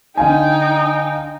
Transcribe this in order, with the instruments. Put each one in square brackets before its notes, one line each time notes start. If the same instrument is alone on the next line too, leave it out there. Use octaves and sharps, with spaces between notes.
[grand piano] D3 F5 G#5 [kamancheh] D#4 G5